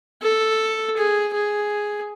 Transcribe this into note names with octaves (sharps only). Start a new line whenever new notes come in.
A4
G#4
G#4